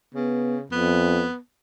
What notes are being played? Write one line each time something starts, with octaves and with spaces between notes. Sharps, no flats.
C#3 B3
F2 B3